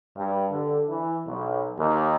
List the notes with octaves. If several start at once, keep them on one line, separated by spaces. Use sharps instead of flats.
G2
D3
E3
B1
D#2